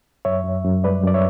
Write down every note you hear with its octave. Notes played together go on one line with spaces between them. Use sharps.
F#2 C#5 E5
F#2
F#2
G3 B4 D5
F#2 D5
C#5 E5